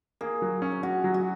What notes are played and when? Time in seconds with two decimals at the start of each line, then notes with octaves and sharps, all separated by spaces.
0.21 A#3 G#4
0.42 F#3
0.62 C#4
0.83 C#4 F#4
1.04 F#3
1.14 F#4